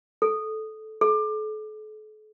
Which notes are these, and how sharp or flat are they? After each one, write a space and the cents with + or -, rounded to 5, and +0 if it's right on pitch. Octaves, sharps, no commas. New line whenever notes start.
A4 -15
A4 -40